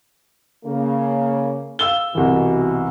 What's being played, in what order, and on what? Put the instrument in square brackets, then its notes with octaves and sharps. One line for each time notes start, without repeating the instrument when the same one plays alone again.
[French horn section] C#3 A#3
[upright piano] F5 E6 G7
[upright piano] C2 E3 [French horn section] B2